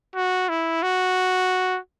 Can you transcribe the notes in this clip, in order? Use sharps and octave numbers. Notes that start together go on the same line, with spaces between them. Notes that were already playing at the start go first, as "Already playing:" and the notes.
F#4
E4
F#4